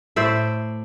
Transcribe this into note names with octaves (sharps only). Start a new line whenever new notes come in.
A2 C5 D5 E5